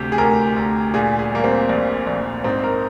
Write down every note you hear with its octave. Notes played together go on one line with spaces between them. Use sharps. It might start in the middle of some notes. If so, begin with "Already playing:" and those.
Already playing: D2 C3 G4
G#4
D2 A#4
D2
A#2 G#4
G#4
G3 A#3
C4
A#1
A#1
G#2 C4
A#4